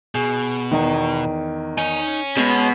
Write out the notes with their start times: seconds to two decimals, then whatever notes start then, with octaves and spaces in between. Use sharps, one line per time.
0.15 B2 G#4
0.71 E2 D#3
1.78 D#4 C#5 G#5
2.37 B2 G#3